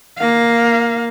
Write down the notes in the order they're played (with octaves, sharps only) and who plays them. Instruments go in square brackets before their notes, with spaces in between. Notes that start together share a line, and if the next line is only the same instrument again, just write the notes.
[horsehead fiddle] A#3 F5